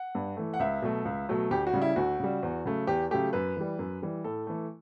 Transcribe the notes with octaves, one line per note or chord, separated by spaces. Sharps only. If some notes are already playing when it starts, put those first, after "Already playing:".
Already playing: F#5
G2
E3 A3
F#5
C#2 E5
B2 F#3 A3
C#2
B2 F#3 A3
D2 G4
F#4
C#3 G3
E4
D2 F#4
C#3 G3
E2
C#3 F#3 A3
E2 G4
C#3 F#3 A3 G4
F#2 B4
E3 G3
F#2
E3 G3
A2 A4
E3 A3